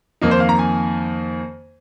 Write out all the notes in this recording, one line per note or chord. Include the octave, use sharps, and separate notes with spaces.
F2 D#3 A#3 D#4
C5
F5
A#5
G#5